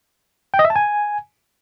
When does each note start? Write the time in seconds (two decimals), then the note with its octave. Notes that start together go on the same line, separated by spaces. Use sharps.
0.54 G5
0.59 D#5
0.65 E5
0.70 A5
0.76 G#5